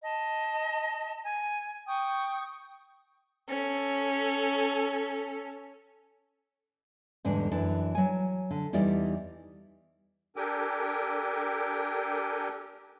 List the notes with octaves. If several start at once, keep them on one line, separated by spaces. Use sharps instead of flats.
D#5 A5
G#5
G5 C#6 D#6
C#4 A4
E2 G#2 D3 G3 D4
F#2 E3 D4
F#3 G#5
D3
E2 E3 G3 D#4 D5
D4 G4 A4 A#4 G5 G#5